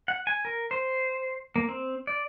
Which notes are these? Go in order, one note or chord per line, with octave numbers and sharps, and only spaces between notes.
F#5
G#5
A#4
C5
A#3
C4
D5